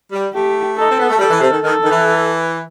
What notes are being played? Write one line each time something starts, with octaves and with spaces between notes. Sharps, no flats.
G3
A3 G4
D#4 A4
C4
B3
A3
G3 A4
E3
C3
D#3
D#3 A4
D#3
E3